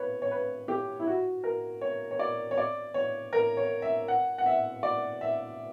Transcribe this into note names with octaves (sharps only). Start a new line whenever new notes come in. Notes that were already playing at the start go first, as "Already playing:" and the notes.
Already playing: B4 C#5
C#5
B4
G4
E4
F#4
A#4
C#5
C#5
D5
C#5
D5
C#5
A#4
C#5
E5
F#5
F#5
E5
D5
E5